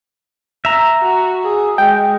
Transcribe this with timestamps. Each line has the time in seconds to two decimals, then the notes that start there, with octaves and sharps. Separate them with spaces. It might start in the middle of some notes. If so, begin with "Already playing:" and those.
0.65 E5 A#5
1.02 F#4
1.43 G#4
1.78 G#3 G5